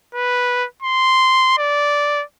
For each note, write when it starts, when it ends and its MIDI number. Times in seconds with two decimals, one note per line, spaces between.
0.15 0.66 71
0.82 1.53 84
1.58 2.23 74